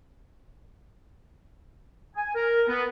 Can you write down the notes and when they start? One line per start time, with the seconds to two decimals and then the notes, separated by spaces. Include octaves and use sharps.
2.16 G#5
2.35 A#4
2.68 B3